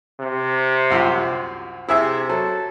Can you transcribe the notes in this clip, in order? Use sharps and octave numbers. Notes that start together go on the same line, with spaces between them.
C3
C2 F#2 F3
C3 E4 G#4 E5
F#3 A4